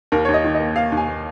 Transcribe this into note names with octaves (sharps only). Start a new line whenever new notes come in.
D#2 A#4
D#2 C#5
D#5
D#3
D#5
A#3
A#3 F5
D#2
G#5
A#3